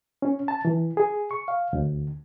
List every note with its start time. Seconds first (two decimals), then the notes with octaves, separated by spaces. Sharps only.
0.22 C#4
0.48 A5
0.65 E3
0.97 G#4
1.31 C#6
1.48 F5
1.73 D2